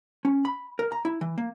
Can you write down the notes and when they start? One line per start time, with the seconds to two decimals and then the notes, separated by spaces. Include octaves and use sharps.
0.25 C#4
0.45 B5
0.79 A#4
0.92 A#5
1.05 E4
1.21 E3
1.38 A#3